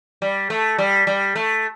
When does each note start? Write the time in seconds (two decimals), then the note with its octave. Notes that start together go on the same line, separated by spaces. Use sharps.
0.22 G3
0.50 A3
0.79 G3
1.07 G3
1.36 A3